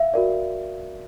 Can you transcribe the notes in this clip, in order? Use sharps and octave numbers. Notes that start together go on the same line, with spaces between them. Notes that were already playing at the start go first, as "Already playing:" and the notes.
Already playing: E5 F5
F#4 A#4 D5